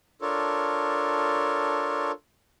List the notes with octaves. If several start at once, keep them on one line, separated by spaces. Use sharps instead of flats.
D4 F4 A4 A#4 C#5